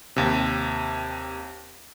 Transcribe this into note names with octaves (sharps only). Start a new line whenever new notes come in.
D#2 C3